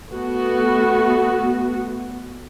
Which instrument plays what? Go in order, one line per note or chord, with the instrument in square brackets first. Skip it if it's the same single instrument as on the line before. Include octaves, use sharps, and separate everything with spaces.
[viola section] A3 B3 F#4